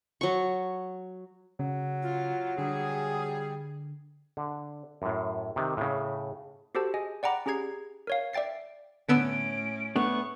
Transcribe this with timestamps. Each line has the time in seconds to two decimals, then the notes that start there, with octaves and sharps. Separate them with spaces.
0.21 F#3 C#6
1.59 C#3 F#3
2.02 F4
2.58 D3 G3 G#4
4.37 D3
5.02 F#2 A2
5.56 C3 D#3
5.77 A2 C#3
6.75 F#4 G4 A4 C5 A5
6.94 G#4 D#5 G#5
7.23 D5 F#5 G5 A#5 B5 D6
7.46 C#4 G4 G#4 A#5 G#6 C7
8.07 A#4 C#5 F5
8.33 D5 E5 G5 A6 C7
9.09 A2 D3 B3 C#4 E6 D7
9.96 A3 B3 D4 C#6